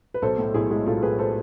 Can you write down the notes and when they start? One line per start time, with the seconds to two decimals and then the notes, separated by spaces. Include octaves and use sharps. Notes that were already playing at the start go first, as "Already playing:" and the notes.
0.14 B4
0.22 B1 A4 C5
0.38 A2
0.54 B1 E4 G#4
0.70 G#3 E4 G#4
0.86 B1 F4 A4
1.02 A2 G#4 B4
1.19 A4 C5